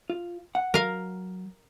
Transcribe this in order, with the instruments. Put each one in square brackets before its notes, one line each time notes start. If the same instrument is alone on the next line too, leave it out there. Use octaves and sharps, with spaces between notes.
[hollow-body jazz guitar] F4
F#5
[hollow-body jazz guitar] F#3 [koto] A#4 F5